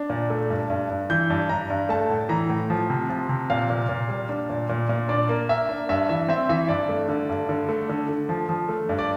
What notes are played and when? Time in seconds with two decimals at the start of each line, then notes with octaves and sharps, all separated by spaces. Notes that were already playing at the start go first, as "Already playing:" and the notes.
Already playing: D4
0.10 A#2
0.30 A3
0.50 G2
0.70 G2
0.90 G2
1.10 E3 G6
1.30 G2
1.49 G2 A#5
1.70 G2
1.89 A3 A5
2.10 A2
2.29 E3 A#5
2.50 A2
2.70 F3
2.90 C3
3.09 F3
3.29 C3
3.50 A#2 F5
3.70 A#2
3.89 A#2
4.09 G3
4.29 D4
4.50 A#2
4.69 A#2
4.89 A#2
5.09 D4 D5
5.29 A#3
5.49 A#3 E5
5.69 D4
5.89 G2 E5
6.09 E3 E5
6.28 C4 E5
6.49 E3 E5
6.68 G2 D5
6.89 A3
7.08 D3
7.29 G2
7.49 D3
7.69 A3
7.89 D3
8.09 D3
8.29 F3
8.49 F3
8.69 A3
8.89 G2
8.99 D5